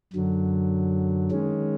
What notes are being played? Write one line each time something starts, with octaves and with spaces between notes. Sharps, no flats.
F#2 D3 F#3
D#3 G#3 C#4